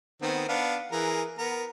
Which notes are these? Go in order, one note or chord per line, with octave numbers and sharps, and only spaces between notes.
D#3 B3 C4
B3 D4 F5
E3 G#4 A#4
B3 A#4